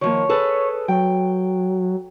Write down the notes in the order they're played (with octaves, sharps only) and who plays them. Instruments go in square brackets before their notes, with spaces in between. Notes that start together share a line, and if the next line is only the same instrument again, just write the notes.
[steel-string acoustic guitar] D#3 F3 A#3 [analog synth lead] C#5
[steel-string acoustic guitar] G#4 A4 B4
[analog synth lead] F#3 [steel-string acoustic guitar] G5